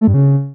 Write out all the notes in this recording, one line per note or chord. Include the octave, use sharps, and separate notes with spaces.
A3
G2
C#3